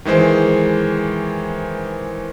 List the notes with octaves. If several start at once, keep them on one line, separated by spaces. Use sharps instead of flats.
D#3 E3 G#3 C5